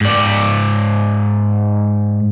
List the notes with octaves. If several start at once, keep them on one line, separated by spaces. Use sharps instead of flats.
G#2 D5